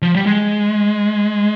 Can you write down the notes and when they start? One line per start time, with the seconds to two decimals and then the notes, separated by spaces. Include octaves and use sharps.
0.02 F3
0.15 G3
0.26 G#3